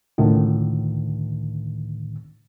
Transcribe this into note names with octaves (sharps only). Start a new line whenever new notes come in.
C#2 A2 D3 D#3